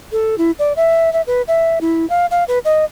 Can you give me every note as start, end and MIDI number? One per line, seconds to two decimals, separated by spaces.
0.12 0.38 69
0.38 0.51 64
0.59 0.73 74
0.77 1.12 76
1.13 1.22 76
1.27 1.42 71
1.48 1.79 76
1.81 2.08 64
2.10 2.26 77
2.31 2.44 77
2.48 2.59 71
2.65 2.85 75